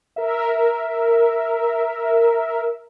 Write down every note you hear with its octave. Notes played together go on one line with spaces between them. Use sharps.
A#4 E5